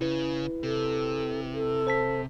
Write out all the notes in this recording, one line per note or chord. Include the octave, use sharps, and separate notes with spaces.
C#3 E4 B4
C3 A4
A4
C5 A5 B6